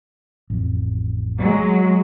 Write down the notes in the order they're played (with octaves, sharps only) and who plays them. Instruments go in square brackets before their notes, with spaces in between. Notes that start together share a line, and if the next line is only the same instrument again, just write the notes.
[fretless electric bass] A1 F2
[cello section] F#3 G#3